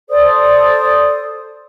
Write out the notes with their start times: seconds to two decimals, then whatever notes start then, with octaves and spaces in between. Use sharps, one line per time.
0.10 A4 C5 D5 D#6